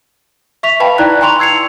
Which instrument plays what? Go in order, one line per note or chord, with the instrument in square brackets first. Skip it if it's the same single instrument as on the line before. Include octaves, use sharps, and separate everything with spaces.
[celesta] E5 C#6 B6 F7
B4 D#5 F5 G5 A5 B5
D#4 E4 D5 G5 A#5 F#6
G5 G#5 A#5 C6 C#6 F7
E6 G#6 C7 C#7 F7